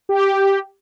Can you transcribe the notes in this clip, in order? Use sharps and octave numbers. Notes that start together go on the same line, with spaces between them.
G4